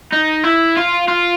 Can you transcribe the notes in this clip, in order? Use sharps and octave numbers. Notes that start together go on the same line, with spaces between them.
D#4
E4
F4
F4